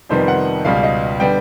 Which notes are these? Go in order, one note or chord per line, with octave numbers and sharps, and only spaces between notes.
F2 C3 D#3 G3 B3 C5
F#5
C#2 B2 G3 F5
D#5
D3 G3 B3 G5